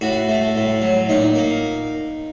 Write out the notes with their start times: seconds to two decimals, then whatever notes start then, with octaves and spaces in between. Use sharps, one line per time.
0.01 A2 F#4
0.29 A3
0.56 A2
0.82 F#3
1.09 A#2 D#4
1.36 A#3